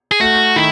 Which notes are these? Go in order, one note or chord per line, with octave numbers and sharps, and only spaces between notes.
G#4
A3 F#4
D#3 E4